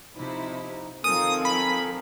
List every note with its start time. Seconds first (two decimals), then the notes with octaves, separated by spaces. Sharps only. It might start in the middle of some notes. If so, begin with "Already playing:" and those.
0.16 C3 F3 D#4 E4
1.04 D#3 F3 C4 A4 A#4 G#5 D#6
1.45 B5